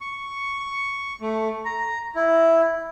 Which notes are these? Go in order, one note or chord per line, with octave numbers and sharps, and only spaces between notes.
C#6
A3
A#5
E4